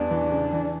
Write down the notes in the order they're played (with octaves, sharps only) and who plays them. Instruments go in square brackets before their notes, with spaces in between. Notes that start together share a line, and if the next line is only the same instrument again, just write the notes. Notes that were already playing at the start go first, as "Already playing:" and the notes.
Already playing: [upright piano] E2 G3 B3 [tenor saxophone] D4
[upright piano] E3
C#3
E3